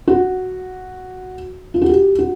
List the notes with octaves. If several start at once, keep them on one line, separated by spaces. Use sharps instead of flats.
F#4
F4
F#4
G4
F#4